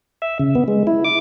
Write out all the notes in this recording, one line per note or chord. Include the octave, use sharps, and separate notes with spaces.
E5
C#3
B3
G#3
E4
D6